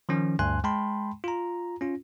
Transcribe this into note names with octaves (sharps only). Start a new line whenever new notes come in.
D#3 F3 C#4
D2 G2 G#5 C6 F#6
G#3 G5 A5 B5 C6
F4 A#5
C#4 F4